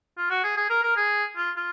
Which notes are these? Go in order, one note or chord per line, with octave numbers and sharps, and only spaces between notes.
F4
F#4
G#4
G#4
A#4
A#4
G#4
F4
F4